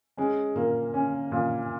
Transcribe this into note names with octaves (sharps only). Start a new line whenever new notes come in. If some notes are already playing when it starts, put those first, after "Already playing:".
G#3 C#4
A#2 A#3
C#4
A#2